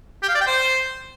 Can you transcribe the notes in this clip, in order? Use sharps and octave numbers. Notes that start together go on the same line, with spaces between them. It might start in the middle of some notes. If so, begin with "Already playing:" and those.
G4
F5
D5
G5
C5